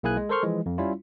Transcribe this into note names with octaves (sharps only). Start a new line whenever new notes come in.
B1 A#3 E4 G#4 G#5 F#6
G#3
A4 A#4 C5 C6 C#6 F6
E3 F3 G#3
F2
G3 C#4 E4 F4